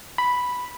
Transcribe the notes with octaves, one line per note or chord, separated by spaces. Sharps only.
B5